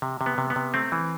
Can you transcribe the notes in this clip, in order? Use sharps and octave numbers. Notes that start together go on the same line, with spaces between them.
C3
C3
B3
C3
B3
C3
A3 C4
E3